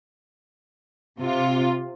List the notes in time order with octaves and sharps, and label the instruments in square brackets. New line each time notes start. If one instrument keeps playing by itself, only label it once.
[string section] C3 F4